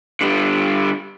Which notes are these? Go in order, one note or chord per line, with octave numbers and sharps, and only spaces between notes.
D3 G3